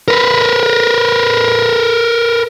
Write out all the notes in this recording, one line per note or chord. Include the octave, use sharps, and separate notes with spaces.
A#4 B4